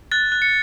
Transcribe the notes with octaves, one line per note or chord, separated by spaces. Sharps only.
F#6 A6
F#6
C#7